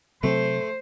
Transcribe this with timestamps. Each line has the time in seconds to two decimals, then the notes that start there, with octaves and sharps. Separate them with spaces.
0.23 C3 F#3 A3 C4 C5